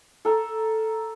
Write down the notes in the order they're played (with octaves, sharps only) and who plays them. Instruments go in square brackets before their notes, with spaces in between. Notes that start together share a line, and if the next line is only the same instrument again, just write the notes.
[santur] A4 A#4